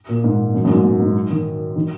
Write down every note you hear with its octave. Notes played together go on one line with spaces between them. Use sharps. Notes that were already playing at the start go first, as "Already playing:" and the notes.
A#2
G#2
F#2
F#2
G#2
G#2
G#2
D#3
D#3